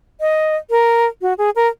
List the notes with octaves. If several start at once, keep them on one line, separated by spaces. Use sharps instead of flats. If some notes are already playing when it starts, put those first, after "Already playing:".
D#5
A#4
F#4
G#4
A#4